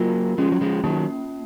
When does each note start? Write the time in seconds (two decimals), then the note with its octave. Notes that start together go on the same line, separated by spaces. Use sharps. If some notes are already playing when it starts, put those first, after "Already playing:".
Already playing: F#3 A#3 F4 A#4
0.38 F3 G#3 C#4
0.52 F#3
0.61 F3 G#3
0.84 D#3 F#3 A#3